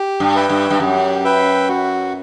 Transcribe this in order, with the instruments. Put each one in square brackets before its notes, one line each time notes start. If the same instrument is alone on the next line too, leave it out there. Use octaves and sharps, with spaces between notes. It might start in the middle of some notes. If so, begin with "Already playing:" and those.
Already playing: [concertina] G4
[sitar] G2
[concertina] B4 E5 G5
[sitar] G2
G2
[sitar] F#2 [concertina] G4
[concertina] B4 E5 G5
F#4